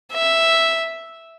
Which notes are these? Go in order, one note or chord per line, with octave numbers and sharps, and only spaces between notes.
E5